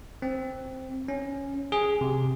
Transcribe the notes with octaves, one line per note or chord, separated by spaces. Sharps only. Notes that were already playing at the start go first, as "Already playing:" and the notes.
C4
C#4
G#4
C3